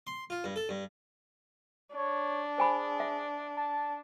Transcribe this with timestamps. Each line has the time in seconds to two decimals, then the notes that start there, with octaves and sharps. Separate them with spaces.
0.07 C6
0.30 F4
0.44 G2
0.56 A4
0.69 G2
1.95 D4 C#5
2.58 G#4 C5 G#5 B5
3.00 E5
3.57 A5